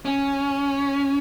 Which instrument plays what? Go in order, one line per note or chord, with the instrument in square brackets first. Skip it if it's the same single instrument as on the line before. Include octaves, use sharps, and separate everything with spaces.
[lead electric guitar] C#4